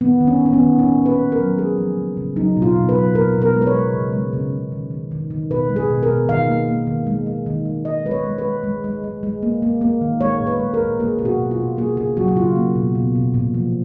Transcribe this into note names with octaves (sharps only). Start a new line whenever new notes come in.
D#3 B3
D#3
C#4
D#3 C#4
B3
D#3
A#2 C#4
A#2
B4
A#3
A#4
F#3
G#3 G#4
F3
C#3
C#3
F#3 D#4
B2
F4
B2
B4
F#3
B2 A#4
B2
A#4
G#3
B4
C#5
G#3
C#3
G#3
C#3
C#3
D#3
D#3
D#3
D#3
B2 B4
G#3
G#4
B2
A#4
B2
D#3 F5
A#3
A#3
D#3
G#3
G#3
D#3
G#3
G#3 D#5
G#3 B4
C#5
G#3
B4
G#3
G#3
G#3
G#3
G#3
A#3
A#3
A#3
D#3
G#3 C#5
A#2
B4
G#3
A#4
A#2
A#3 G#4
B2 G#4
F#4
B2
F4
B2
A#3 G#4
C#3 G#4
F#3 F#4
F#4
C#3 F4
A#3
B2
B2
B2
A#2
F3